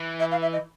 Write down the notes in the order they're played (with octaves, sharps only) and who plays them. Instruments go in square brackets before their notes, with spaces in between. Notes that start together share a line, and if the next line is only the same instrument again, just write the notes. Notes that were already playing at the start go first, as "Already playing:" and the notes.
Already playing: [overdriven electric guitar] E3
[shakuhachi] E5
F5
E5
D#5